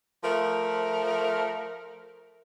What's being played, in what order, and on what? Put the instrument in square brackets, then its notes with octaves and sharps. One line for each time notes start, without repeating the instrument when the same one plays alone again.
[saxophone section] F3 A3 A#4